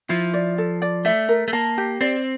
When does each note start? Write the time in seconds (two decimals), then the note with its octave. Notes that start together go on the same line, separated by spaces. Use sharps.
0.09 F3 E4
0.34 D5
0.58 A4
0.82 D5
1.05 A3 E5
1.29 A#4
1.48 A3
1.53 A#3 A5
1.78 G4
2.01 C4 D5